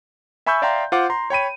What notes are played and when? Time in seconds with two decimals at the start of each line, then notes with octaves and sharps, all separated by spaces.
0.46 E5 G#5 B5 C#6 E6 G6
0.62 D5 E5 F5 G5 A#5 C6
0.92 F4 C5 F#5 D6
1.10 A#5 C6
1.30 C#5 G5 B5 D#7